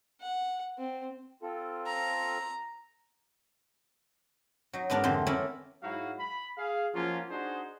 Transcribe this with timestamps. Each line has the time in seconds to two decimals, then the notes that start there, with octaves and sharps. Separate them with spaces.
0.21 F#5
0.78 C4
1.43 C4 F4 A4
1.87 A#5
4.73 F#3 D#4
4.90 G#2 B3 D4 A#4 D5
5.04 F2 D3 E3 C4 D#4 C5
5.27 C#4 E4 A4 A#4 D5
5.83 G#2 F#3 E4 F#4 F5
6.20 B5
6.58 G#4 F5
6.95 F3 F#3 A#3 C#4 F4
7.30 D4 D#4 F#4 G#4 C5